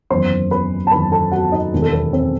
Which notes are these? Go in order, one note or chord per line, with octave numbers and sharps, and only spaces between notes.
F#1 E2 D#3 C5 C6
B4 B5
A5
F#1 E2 D#3 B4 B5
A4 A5
F#4 F#5
D#4 D#5
E1 D#2 D#3
A4
B3 B4
C4 C5